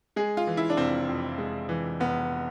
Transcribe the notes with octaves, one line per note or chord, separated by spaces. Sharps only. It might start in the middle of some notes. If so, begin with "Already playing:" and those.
G#3 G#4
F4
E3
E4
D4
F1 C4
F2
G#3
E3
F1 B3